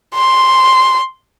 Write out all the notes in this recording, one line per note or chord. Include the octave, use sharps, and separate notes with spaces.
C6